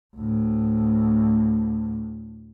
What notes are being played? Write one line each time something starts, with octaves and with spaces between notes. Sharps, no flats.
D2 A2